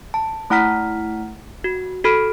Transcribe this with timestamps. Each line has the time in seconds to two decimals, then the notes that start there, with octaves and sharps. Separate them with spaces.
0.14 A5
0.50 A3 E4 F#5 A#5 F6 B6
1.64 F#4
2.04 F#4 A4 B5 F6 D7